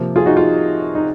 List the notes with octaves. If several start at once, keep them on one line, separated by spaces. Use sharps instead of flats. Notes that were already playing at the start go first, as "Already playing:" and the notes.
Already playing: C3 F3 A#3
F4 G#4
D#4 F#4
F4
D#4